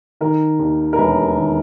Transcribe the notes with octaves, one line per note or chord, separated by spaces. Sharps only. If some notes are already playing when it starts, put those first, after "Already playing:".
D#3 A#4
D#2
A#4
E1 B4
D#3